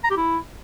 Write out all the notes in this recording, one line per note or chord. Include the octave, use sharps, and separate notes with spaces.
A#5
G4
E4